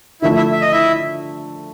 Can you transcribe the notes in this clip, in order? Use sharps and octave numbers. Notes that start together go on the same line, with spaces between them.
D3 F3 A3 E4 E5
E4 E5
E5
D#5
E4 E5